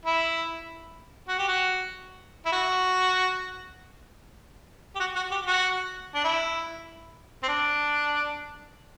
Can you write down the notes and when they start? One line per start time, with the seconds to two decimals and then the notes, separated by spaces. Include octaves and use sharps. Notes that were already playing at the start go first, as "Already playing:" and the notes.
0.05 E4
1.28 F#4
1.38 G4
1.48 F#4
2.46 E4
2.52 F#4
4.95 G4
5.00 F#4
5.16 F#4
5.31 G4
5.47 F#4
6.15 D4
6.24 E4
7.43 C4
7.48 D4